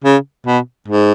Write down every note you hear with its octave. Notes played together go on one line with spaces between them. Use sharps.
C#3
B2
G#2